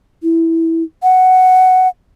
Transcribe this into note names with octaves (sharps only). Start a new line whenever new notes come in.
E4
F#5